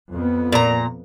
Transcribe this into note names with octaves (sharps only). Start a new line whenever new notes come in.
F2 B3
A#2 A#5